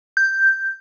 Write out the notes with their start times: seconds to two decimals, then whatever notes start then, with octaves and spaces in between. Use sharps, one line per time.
0.17 G6